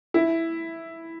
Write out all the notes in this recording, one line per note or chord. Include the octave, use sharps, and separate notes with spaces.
E4